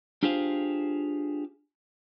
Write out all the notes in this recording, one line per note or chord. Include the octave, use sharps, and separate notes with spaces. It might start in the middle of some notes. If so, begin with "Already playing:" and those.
D4 F4 G4 G#4 C5 F5